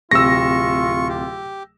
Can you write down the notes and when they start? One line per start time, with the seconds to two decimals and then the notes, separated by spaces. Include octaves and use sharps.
0.11 D1 C3 F4 C#6 E6 A#6
1.09 G4